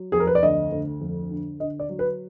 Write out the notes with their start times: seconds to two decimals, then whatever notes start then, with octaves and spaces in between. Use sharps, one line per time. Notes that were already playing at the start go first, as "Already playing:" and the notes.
Already playing: F#3
0.12 F2 G#4
0.20 A#4
0.27 B4
0.35 D5
0.43 D2 D#5
0.72 D2
1.01 F2
1.31 D3
1.60 D3 D#5
1.79 D5
1.90 F#3
1.99 B4